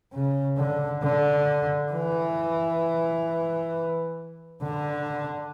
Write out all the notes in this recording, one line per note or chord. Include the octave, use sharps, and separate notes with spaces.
C#3
D3
D3
E3
D3